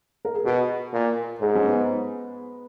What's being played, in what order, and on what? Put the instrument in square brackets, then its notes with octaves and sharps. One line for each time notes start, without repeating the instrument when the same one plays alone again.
[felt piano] A#4
G#4
[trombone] B2 [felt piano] F#4
[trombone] A#2
[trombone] G#2 [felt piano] G#4
[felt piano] C#4
B3